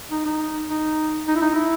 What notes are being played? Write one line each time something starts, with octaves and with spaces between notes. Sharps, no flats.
D#4
D#4
D#4
D#4
E4
D#4
E4